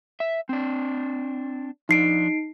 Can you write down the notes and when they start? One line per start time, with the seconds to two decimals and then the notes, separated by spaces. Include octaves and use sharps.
0.20 E5
0.49 C4 D4
1.89 F3 D4 D#4 C7 D7